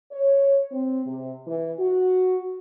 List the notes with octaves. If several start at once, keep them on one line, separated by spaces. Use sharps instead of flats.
C#5
C4
C3
E3
F#4